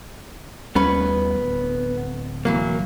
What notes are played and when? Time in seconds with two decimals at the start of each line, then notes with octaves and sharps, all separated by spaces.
0.75 D#2 G3 A3 B3 C#4 B4
1.40 D1
2.45 E3 F#3 A#3